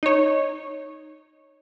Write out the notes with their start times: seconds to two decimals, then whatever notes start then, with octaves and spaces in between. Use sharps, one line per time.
0.03 D#4 C#5